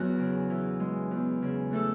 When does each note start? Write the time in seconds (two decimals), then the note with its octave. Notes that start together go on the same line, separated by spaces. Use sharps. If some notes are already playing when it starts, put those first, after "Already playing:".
Already playing: E2 F#3 F#4
0.18 C#3
0.50 E3
0.80 G#3
1.11 E2
1.42 C#3
1.71 E3 A3 A4